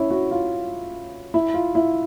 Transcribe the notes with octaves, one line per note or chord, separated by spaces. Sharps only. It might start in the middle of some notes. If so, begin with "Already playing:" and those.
Already playing: C#4 E4
F#4
F4
E4
F4
E4